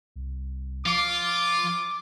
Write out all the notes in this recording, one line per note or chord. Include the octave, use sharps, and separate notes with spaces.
C2
F3 F4 D6